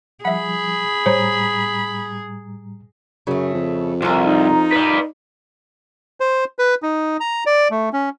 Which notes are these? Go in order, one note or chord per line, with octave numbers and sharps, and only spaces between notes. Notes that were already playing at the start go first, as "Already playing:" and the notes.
F3 G3 G#4 E5 F#5 B5
A2 G3 C5 C#5 A#5
F#2 C#3 A3
F2
C2 F4 A#4
D#4
B4 D5
C5
B4
D#4
A#5
D5
A3
C#4